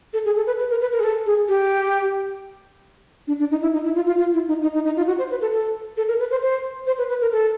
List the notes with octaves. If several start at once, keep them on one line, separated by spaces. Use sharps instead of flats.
A4
G#4
A4
B4
B4
A#4
B4
A#4
G#4
A4
G#4
G4
D4
D4
D#4
E4
D#4
E4
F4
F4
F4
E4
D#4
D#4
D#4
D#4
F4
F#4
C5
B4
A4
A4
A4
A#4
B4
C5
C5
C5
B4
B4
A#4
A4